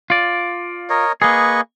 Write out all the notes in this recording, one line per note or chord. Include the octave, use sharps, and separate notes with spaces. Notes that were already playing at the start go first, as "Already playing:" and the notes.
F4 D5
A#4 C#5 D#5
A#3 G#4 B4 D#5 C#6